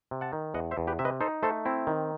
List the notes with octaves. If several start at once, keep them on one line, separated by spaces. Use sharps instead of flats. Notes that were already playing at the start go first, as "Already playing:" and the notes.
C3
F#5 A5
D#3
E2 D#5 F#5
C5 E5
E2
G4 B4
C3 E5
B4 D#5
D#4 A4 C5
A3 A4 C5
C4 E4
D#3